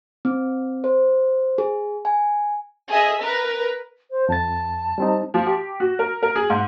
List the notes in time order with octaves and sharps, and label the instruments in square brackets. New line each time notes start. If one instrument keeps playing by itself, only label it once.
[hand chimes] C4
C5
G#4
G#5
[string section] G#4 D#5 E5
A#4 B4
[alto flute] C5
[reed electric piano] F2 A6 [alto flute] A5
[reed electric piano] G3 C4 D#4
[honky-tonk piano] F3
G4
F#4
A#4
A#4
G#4
G#2